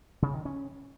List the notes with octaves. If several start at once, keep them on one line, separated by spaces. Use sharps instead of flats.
C#3
D#3
C#4